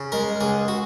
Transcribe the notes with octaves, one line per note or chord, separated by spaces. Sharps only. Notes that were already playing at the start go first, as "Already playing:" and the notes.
Already playing: C#3
G#3 A#4
C#2 G#4
F#4